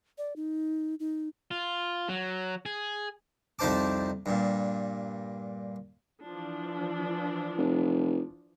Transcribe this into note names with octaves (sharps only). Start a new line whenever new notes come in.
D5
D#4
D#4
F4
F#3
G#4
C2 F2 D#4 C5 A5 D6
G2 A#2
E3 F3 D4
F1